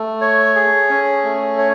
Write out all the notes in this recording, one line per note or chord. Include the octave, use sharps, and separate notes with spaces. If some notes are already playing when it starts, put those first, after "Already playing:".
Already playing: A3
C#5
G#4
C#4
A3
C#5